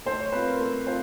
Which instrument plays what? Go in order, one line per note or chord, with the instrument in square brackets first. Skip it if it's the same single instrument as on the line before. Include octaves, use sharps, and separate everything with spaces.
[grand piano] A3 [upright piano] C5
[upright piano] C#5
[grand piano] C4 F4 [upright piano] B4
[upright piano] A#4
[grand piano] A3
[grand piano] C4 F4 [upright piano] C5